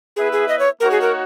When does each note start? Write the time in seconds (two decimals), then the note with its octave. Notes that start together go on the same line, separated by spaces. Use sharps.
0.16 B3 E4 G#4 B4 E5
0.32 G#4
0.48 D#5
0.59 C#5
0.80 A#3 D#4 F#4 A#4 C#5
0.91 G#4
1.01 A#4